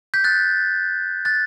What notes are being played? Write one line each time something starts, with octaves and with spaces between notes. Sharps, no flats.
G6 B6
F#6 A6
F#6 A6